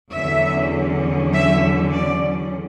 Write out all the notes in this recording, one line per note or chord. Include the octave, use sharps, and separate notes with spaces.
E2 D3 F#3 C#4 E5
E5
D5